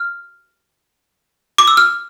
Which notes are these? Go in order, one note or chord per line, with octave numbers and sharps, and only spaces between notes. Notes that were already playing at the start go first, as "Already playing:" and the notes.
Already playing: F6
D6
E6
F6